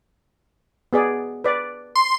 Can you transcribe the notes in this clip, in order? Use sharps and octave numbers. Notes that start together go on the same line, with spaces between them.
B3 G#4 D5
B4 D5
C6